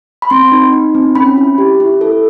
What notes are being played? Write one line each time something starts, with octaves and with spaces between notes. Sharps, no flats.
B5
C4 C6
D#4
D#4
C4
C#4 B5
E4
G4
E4
A4